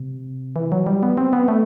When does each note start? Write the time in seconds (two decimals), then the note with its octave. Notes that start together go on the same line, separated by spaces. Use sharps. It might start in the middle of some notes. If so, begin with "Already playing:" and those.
Already playing: C3
0.56 E3
0.72 F#3
0.87 G3
1.03 B3
1.17 C4
1.33 B3
1.48 A3